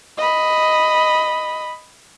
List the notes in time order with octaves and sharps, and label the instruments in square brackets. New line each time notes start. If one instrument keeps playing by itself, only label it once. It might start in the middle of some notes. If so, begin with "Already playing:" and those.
[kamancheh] D#5 B5